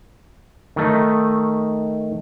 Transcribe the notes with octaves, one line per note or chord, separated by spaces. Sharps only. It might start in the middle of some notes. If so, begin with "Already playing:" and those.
D#3 A3 D#4